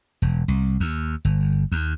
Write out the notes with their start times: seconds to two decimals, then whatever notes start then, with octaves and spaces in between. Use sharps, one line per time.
0.22 E1
0.48 C2
0.80 D#2
1.25 G1
1.72 D#2